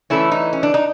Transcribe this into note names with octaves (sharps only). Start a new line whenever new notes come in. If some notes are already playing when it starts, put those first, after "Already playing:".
E3 A3 C#4 E4
D#4
C#4
D4
D#4